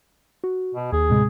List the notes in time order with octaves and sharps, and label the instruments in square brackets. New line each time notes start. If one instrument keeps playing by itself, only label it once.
[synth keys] F#4
[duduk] B2
[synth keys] D#2 [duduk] G#4
[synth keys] A2 C3 G#3